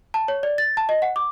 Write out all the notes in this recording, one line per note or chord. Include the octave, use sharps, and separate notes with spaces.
A5
C#5
D5
A6
A5
D#5
F#5
D6